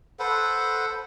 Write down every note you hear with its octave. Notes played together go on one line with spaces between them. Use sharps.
A4 B4 C5 F#5